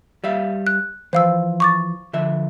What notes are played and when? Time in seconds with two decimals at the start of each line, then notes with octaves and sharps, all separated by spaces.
0.24 G3 E5 F5
0.67 F#6
1.13 E3 F3 C5 F5 E6
1.60 C#6 D6 A6
2.13 D3 F3 E5